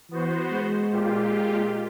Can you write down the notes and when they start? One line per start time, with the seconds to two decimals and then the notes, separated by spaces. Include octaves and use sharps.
0.11 E3 B3 F#4 C5
0.52 G#3
0.92 A#2 F4 G4